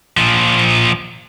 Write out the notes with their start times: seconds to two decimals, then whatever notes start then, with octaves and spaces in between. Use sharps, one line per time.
0.17 A#2 F3